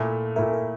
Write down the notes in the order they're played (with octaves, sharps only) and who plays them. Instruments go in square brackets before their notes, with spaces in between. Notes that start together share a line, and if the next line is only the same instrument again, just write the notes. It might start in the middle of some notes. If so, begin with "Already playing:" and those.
Already playing: [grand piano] A#2 A3 E4 [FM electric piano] A4
[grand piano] A#2 A3 E4 [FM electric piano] A#4
[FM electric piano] A#4